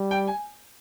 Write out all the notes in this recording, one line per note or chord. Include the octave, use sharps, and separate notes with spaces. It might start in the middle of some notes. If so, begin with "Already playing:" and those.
Already playing: G3
G5
G#5